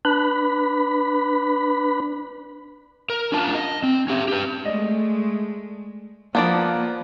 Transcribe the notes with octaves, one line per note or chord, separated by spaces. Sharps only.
D4 B4 B5
A#4
C#4 D4 F4 A5
D#5
C4
C#4 G4
G4 B4
G#3 A3 D5 D#5
F3 A#3 B3 D4 D5